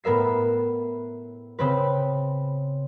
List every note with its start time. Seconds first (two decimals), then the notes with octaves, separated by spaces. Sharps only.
0.04 A2 B3 A#4 E5 C7
1.59 C#3 C4 B4